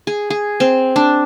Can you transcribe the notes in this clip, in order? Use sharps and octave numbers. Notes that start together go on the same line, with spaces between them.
G#4
G#4
C4
D4